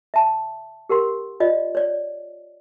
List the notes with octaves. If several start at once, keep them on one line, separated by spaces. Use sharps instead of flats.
E5 A5
G4 A#4 F#5 C6
F4 D5 D#5
C#5 D5